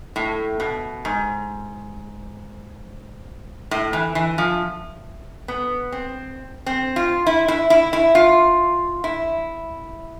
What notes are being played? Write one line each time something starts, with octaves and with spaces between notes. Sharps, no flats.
A2
B2
G#2
A2
E3
E3
F3
B3
C4
C4
F4
E4
E4
E4
E4
F4
E4